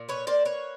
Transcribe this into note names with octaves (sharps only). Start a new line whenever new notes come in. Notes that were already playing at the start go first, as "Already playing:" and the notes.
Already playing: A#2
B4 C#5
A#3 C5 D5
B4 C#5